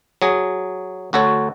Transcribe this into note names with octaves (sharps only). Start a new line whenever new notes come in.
F#3 G#4
D2 F#4 A4 C#5